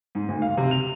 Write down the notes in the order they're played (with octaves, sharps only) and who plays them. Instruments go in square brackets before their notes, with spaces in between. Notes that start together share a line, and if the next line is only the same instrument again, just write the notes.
[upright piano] G#2
D2
F5
C3
F7